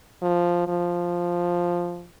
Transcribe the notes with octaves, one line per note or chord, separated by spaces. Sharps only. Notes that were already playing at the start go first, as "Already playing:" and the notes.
F3
F3